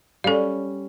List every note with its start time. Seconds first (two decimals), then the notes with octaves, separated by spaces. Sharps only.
0.24 G3 C#4 A4 F5